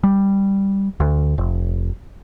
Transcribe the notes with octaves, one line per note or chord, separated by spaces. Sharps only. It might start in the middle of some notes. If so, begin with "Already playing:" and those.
G3
D2
F1